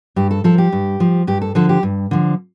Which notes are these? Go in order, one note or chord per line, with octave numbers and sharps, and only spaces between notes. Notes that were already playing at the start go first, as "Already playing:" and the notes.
G2 G4
A4
F3 A4
G4
G2
F3
G2 G4
A4
D3 F3 A4
G4
G2
D3 F3